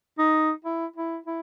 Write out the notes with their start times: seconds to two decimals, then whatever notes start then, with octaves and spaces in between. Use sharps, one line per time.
0.18 D#4
0.64 E4
0.96 E4
1.26 E4